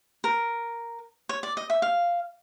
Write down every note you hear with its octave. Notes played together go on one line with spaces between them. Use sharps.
A#4
C#5
D5
D#5
E5
F5